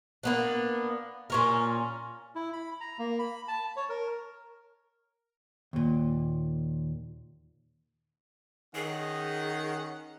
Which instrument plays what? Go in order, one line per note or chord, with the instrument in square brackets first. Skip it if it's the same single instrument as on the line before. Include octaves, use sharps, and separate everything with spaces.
[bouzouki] A#3 B3 D4
A#2 C#4 A#4
[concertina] E4
B5
A#5
A#3
B5
A5
C#5
A#4
[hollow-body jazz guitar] D#2 A#2
[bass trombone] D#3 [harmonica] C#4 F#5 [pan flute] G#4